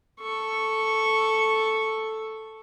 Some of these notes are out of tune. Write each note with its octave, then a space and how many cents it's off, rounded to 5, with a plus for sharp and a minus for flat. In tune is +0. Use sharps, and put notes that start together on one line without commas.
A4 +0 C#6 -5